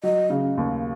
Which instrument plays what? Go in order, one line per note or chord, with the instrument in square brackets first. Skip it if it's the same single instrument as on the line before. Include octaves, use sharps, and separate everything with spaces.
[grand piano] F#3 [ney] D#5
[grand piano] C#3
D#2